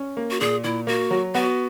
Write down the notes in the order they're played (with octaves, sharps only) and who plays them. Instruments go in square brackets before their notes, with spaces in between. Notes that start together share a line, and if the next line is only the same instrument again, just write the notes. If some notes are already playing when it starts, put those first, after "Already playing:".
Already playing: [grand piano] C#4
A#3
[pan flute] F#4
[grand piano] A#2 [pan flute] G#4
[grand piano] A#2 [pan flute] E4
[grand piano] A#3 [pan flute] F#4
[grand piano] F#3
[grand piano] B3 [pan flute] F#4